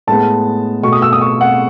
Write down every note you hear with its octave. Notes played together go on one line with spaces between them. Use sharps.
A2 G#3 B3 A5
B2 A3 C#6
D#6
E6
D#6
C#6
F#5